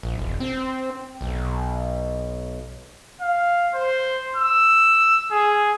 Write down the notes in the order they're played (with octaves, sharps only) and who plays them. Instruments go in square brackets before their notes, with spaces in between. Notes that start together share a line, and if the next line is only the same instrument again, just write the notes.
[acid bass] A#1
E1
C4
B1
[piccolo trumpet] F5
C5
E6
G#4